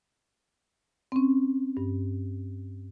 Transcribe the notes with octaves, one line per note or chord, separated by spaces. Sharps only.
C4 C#4
G2